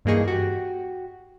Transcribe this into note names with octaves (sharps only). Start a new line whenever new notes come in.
G2 E3 A#3 D#4 G#4 C#6
F#4 G4